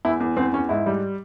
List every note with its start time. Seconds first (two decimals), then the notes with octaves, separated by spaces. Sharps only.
0.05 E2 E4
0.20 E2
0.37 E2 C4
0.53 E2 C#4
0.69 G#2 E4
0.86 G3